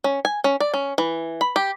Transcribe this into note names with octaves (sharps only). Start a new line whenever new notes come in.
C#4
G#5
C#4
D5
C#4
E3
B5
G4